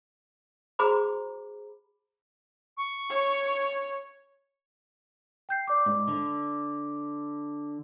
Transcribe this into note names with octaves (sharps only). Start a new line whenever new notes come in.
F#4 G#4 C5 A#5 B5 D6
C#6
C#5
G5 G6 C7
D5 D6
G#2
D3